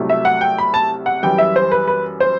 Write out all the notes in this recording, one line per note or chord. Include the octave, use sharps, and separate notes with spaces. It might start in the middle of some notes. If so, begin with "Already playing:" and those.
Already playing: C2 C3 F#3 A3
E5
F#5
G5
B5
A5
F#5
F#2 E3 G3 G5
E5
C5
B4
B4
C5